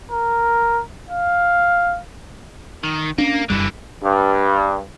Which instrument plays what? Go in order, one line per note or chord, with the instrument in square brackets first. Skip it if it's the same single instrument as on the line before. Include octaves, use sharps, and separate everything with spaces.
[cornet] A#4
F5
[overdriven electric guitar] D#3
[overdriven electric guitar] A#3 [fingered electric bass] C#4 D4
[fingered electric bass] F1 F#2 G3 [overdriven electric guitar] D3 E3
[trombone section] G2